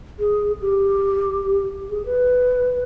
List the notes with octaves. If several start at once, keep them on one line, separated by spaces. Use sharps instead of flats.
G#4
G4
G#4
B4